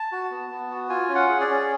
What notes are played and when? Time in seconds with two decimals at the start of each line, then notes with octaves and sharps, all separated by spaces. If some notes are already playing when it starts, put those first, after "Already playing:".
Already playing: A5
0.12 F#4
0.31 B3
0.51 B3
0.71 F#4
0.89 F4 G#5
1.09 C#4
1.15 F#5
1.28 G#4
1.41 D5
1.47 C#4